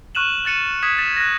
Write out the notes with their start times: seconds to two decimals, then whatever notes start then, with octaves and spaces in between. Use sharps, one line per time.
0.15 C#6 F6 F#6 D#7 E7 F#7
0.45 F#6 A6 C#7 D#7 E7
0.83 D#6 G#6 B6 E7
0.98 A6 B6 E7
1.16 F#6 A#6